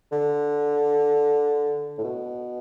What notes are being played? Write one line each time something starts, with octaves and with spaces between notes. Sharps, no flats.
D3
A2
B2